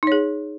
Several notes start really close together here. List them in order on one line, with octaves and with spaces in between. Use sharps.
D#4 C#5 G#4